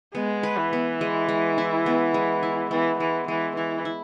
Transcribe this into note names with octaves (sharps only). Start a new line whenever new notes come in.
G#3 B3
B4
E3
B3
G#3
G#3
E4
B3
G#3
E4
E3 B3
E3 G#3
E3 G#3
E3 E4
E4